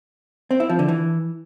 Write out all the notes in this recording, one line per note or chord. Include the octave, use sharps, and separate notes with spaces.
C4
E4
F3
D3
E3